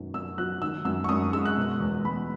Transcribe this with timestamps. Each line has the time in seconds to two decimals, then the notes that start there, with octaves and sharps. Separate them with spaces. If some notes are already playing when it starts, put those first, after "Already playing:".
Already playing: F#2 B2 D#3
0.14 F#2 E6
0.38 F#3 F#6
0.61 D#3 E6
0.85 F#2 E6
1.04 C#6
1.09 F#2 D#6
1.33 G#3 E6
1.46 F#6
1.57 B2
1.81 E2
2.05 E2 B5